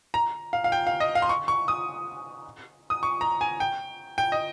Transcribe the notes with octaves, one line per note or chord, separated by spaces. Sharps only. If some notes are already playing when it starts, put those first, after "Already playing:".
A#5
F5
F5
G5
F5
D#5
F5
C6
C#6
C#6
D#6
D#6
C#6
A#5
G#5
G5
G5
D#5